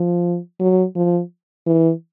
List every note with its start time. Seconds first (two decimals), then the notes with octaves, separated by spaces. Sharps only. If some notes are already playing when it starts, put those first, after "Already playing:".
Already playing: F3
0.60 F#3
0.96 F3
1.67 E3